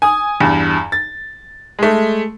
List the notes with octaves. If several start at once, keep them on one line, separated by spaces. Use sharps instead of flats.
G#5 D#6
E2 G2
A6
G#3 A3